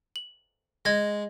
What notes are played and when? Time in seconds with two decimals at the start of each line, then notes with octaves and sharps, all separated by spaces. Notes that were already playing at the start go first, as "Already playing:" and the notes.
0.16 F#7
0.85 G#3 D#5 G#6 A#6